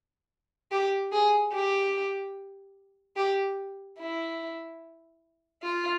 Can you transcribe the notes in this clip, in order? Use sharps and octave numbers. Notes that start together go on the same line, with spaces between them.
G4
G#4
G4
G4
E4
F4